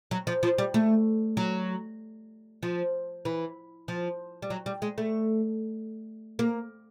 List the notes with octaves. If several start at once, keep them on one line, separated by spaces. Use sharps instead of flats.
F#3
F3
F3
G3
A3
F#3
F3
E3
F3
G3
F#3
G3
G#3
A3
A#3